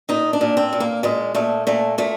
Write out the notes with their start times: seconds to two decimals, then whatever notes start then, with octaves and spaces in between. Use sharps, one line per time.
0.09 A#2 D#4
0.33 D4
0.41 A#2
0.57 C4
0.73 A#2
0.80 A#3
1.03 A#2 G#3
1.35 A#2 A3
1.67 A#2 A3
1.98 A#2 A3